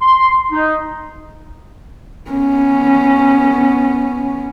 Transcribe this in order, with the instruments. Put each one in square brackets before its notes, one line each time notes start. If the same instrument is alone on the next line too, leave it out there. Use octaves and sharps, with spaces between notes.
[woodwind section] C6
D#4
[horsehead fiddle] B3 C#4